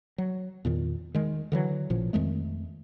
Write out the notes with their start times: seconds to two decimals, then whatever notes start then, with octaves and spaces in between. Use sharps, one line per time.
0.18 F#3
0.65 E2 A#2 D#3
1.14 D#3 G#3
1.52 D3 E3 F#3
1.90 A1 A#2 F3
2.13 F2 D#3 G#3 A3